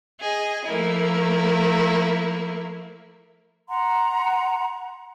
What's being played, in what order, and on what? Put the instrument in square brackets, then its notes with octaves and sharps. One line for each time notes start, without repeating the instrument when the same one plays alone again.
[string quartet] G#4 D#5
F3 A3 A#3 E4
[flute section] F#5 A#5 C6